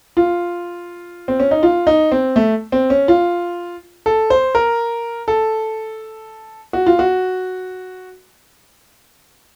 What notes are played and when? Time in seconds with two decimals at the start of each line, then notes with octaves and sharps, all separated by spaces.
0.17 F4
1.28 C4
1.40 C#4
1.51 D#4
1.63 F4
1.87 D#4
2.12 C4
2.36 A3
2.72 C4
2.90 C#4
3.08 F4
4.06 A4
4.30 C5
4.55 A#4
5.28 A4
6.73 F#4
6.86 F4
6.99 F#4